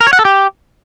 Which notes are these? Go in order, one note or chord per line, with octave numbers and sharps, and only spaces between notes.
A#4
C#5
F#5
A4
G4